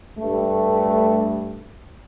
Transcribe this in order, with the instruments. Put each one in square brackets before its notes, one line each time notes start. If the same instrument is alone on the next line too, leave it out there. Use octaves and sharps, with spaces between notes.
[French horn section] G2 A3